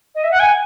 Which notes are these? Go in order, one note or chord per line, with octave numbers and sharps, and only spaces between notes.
D#5
E5
F#5
G#5